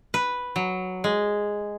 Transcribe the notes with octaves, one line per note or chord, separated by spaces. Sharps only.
B4
F#3
G#3